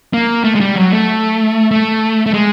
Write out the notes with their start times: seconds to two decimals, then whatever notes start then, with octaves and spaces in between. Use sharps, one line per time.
0.13 A#3
0.44 A3
0.55 G#3
0.60 G3
0.76 F#3
0.92 A3
1.71 A3
2.26 A3
2.34 G#3